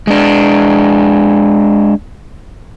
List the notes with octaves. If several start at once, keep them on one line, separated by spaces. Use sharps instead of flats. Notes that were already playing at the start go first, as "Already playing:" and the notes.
G#3 D4